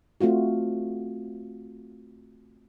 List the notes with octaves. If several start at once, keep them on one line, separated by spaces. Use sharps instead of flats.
A3 C4 F4 F#4